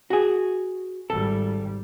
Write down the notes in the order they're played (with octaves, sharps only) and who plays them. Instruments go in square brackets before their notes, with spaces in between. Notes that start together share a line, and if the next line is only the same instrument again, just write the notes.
[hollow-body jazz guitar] F#4 G#4
[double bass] G#1 G3 [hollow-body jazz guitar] A4